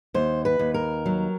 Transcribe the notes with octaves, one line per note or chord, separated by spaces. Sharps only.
D#2 C5
B4
D#2
A#4
F#3